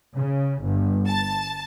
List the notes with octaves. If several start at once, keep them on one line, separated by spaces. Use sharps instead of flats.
C#3
G1
A5